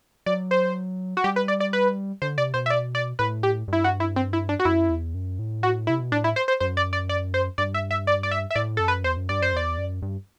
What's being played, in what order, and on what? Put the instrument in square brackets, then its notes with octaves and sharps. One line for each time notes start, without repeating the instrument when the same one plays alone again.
[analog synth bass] F#3 [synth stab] D5
[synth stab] C5
F#4
[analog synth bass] G3 [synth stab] G4
[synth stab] B4
D5
D5
B4
[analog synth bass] D3 [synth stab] C5
[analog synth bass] C3 [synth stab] D5
[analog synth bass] B2 [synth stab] C5
[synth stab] E5
D5
D5
[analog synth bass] A2 [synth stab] B4
[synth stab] G4
[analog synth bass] G2 [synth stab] E4
[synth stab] F#4
E4
C4
E4
D4
F#4
[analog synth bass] F#2 [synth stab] E4
[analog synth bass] E2
F#2
A2
[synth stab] F#4
[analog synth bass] C3 [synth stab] E4
[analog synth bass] B2
[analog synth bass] A2 [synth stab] D4
[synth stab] E4
C5
C5
[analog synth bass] F#2 [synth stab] C5
[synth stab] D5
D5
D5
C5
[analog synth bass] G2 [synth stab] D5
[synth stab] E5
E5
D5
D5
E5
E5
[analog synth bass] A2 [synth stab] D5
[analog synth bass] F#2 [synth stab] A4
[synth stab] B4
[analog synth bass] E2 [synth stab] C5
[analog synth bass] F#2
[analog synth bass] G2 [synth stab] D5
[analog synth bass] F#2 [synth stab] C5
[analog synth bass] E2 [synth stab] D5
[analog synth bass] F#2
G2